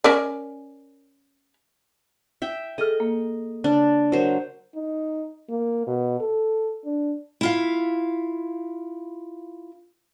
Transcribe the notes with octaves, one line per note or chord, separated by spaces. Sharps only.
C#4 A#4 D5
E5 G5
G#4 A4 D#5 F6
A#3
C#3 D4
F#3 A#4 C5
D#4
A#3
B2
A4
D4
E4 F4 F5